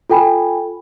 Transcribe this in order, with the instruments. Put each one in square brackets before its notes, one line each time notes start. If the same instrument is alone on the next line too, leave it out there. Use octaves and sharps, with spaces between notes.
[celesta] F4 A4 G5 G#5 B5